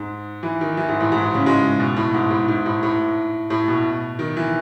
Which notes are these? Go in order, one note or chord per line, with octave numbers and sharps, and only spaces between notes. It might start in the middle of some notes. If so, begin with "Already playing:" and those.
Already playing: G#2
E3
D#3
E3
G#2
A2
G#2
A2
C#3
G#3
B2
A2
G#2
A2
G#2
A2
A2
A2
B2
D#3
E3